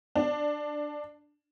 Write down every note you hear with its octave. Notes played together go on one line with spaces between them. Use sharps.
D4